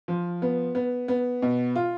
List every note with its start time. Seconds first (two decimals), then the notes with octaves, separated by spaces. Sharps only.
0.08 F3
0.42 B3
0.75 B3
1.08 B3
1.42 B2
1.76 F4